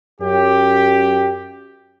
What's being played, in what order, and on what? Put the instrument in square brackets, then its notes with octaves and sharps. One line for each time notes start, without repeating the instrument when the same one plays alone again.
[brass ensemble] F#2 G4